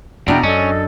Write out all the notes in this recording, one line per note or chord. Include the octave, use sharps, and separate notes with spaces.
E2 B2 D4 E4 D5 G5 A#5
F#2 C#4 A4 D#5